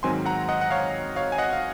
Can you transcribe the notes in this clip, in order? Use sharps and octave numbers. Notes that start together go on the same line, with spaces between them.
G#2 D#3 F#3 C4 G#5 C6
F#5 A#5
D#5 F#5
F#5
C#5 F5
C#5 F5
G#5
D#5 F#5
F5